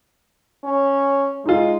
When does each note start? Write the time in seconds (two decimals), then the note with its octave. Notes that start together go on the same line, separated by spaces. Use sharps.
0.64 C#4
1.46 G#3 D#4 F4